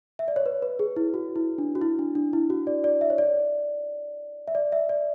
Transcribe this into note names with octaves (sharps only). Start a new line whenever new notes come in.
E5
D5
C#5
B4
B4
G#4
E4
F#4
E4
D4
F#4
E4
D4
D4
E4
F#4
D5
D5
E5
C#5
D5
E5
D5
E5
D5